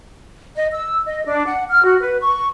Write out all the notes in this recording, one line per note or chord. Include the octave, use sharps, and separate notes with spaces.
D#5
E6
D#5
D4
F#5
F6
F#4
B4
C#6